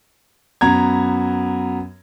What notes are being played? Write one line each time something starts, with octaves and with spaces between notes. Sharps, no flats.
F#2 B3 A#5 G#6